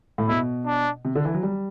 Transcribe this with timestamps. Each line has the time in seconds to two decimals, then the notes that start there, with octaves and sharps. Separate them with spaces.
0.18 A2
0.28 B2 E4
0.66 D4
1.05 C3
1.15 D3
1.25 E3
1.35 F#3
1.43 G3